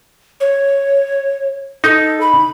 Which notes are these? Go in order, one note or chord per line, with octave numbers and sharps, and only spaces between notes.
C#5
D#4 A4
B5